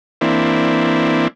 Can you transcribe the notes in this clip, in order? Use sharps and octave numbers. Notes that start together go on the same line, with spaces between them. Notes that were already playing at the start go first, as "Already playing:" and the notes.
E3 A#3 C4 D4 E4